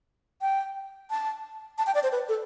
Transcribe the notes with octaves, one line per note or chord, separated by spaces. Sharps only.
G5
A5
A5
G5
D5
C5
B4
A4